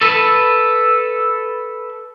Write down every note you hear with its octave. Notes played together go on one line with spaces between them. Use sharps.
A4 B4